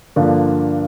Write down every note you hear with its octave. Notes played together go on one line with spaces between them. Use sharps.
G2 D3 F3 A#3 D4